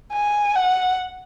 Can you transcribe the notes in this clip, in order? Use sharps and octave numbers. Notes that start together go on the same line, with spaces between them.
G#5
F#5